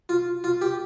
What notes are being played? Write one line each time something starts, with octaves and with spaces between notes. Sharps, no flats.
F4
F4
G4